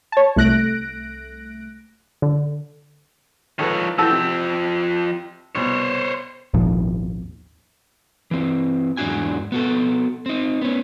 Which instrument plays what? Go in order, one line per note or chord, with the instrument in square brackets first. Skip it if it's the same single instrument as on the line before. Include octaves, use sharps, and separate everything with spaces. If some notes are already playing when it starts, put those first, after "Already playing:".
[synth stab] C#5 A5
C2 A3 F#6 A#6 D7
D3
[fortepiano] D#3 A4 B4 [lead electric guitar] F3 C#5
[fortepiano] E3 F#4 A4 [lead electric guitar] F3 G5 [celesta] A5 E6
[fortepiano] C3
[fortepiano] C2 B2 [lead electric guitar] C5 C#5
[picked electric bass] G#1 D#2 A#2 F3
[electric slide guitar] E3 C4
E2 G#2 F#3 D4 F#4 G#5
B3 F#4 A4
C4 D#4
B3 C#4